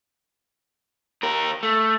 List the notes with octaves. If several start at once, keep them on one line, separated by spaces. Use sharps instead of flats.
D#2 A#4
A3